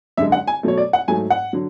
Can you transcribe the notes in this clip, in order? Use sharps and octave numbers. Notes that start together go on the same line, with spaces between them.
F#2 D3 G#3 E5
F#5
G#5
B2 F#3 A3 C#5
D5
F#5
G#2 F#3 A3 G#5
F#5
D3 F#3